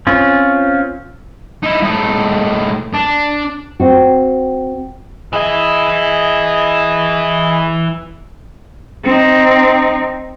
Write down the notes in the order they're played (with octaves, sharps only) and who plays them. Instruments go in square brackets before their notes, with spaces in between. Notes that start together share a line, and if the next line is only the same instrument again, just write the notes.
[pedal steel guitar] C4 C#4 F4
[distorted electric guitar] D#4 E4
A2 D#4
D4
[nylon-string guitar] C4 F#4
[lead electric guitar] E3 E4 [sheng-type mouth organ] G#4 D#5
[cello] C4 D#4